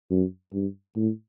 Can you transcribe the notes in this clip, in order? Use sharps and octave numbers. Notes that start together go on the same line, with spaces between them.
F#2
G2
A2